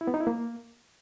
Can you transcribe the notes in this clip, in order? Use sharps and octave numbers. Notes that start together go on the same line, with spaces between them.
E4
B3
D#4
E4
A#3